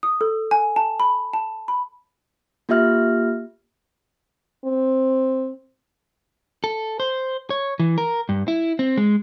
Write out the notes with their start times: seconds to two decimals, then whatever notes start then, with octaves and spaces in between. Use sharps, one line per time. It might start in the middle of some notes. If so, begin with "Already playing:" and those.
0.03 D#6
0.21 A4
0.51 G#5
0.76 A5
1.00 B5
1.33 A5
1.68 B5
2.69 A#3 F4 G4 E5 F6
4.65 C4
6.64 A4
7.00 C5
7.50 C#5
7.79 E3
7.98 A#4
8.29 G2
8.48 E4
8.79 C4
8.97 G#3